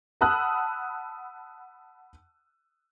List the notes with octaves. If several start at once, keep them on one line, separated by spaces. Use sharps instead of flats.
F#5 A5 B5 D#6 E6 F#6